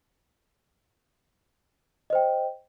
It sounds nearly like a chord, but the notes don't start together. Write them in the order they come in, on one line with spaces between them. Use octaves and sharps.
D#5 C5 G5